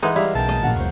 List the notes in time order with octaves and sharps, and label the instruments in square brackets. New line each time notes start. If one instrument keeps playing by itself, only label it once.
[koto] E3 G#3 D#4 [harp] B4 F#5 A#5
[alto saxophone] G3 [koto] E4 [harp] F5 A#5
[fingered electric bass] B1 [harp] C#3 A#4 G5 [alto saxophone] A5
[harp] G#3 A#3 [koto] D#5
[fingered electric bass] G#1 A#2 [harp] F#4 F5 F#5
[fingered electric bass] E1 C2 [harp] C5 C#6